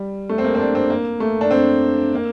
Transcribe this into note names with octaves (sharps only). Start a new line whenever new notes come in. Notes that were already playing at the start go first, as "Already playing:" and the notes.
Already playing: G3
A3
C4
A#3
C4
D4
C4
A#3
A3
D4
C4
A#3